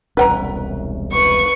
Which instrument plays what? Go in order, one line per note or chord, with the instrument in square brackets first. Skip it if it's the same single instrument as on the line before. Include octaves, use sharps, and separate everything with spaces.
[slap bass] E1 C2 C#4 [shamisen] B4 G5 A#5
[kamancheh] B4 [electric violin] C#6